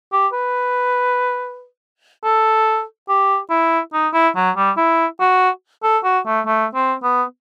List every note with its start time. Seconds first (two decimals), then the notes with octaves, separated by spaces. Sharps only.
0.12 G4
0.33 B4
2.24 A4
3.09 G4
3.50 E4
3.93 D#4
4.14 E4
4.36 F#3
4.57 G3
4.77 E4
5.20 F#4
5.83 A4
6.04 F#4
6.26 A3
6.46 A3
6.75 C4
7.03 B3